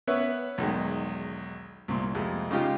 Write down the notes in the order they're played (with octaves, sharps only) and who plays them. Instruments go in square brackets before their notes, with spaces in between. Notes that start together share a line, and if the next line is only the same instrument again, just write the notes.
[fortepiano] B3 C#4 B4 C#5 E5
B1 E2 D#3 G#3
C2 A#2 C6
F2 C3 G#3
C#3 G#3 D#4 F4 G4